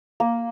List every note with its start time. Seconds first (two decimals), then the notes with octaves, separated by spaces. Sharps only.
0.20 A#3